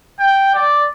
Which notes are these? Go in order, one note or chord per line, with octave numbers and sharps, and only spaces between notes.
G5
D5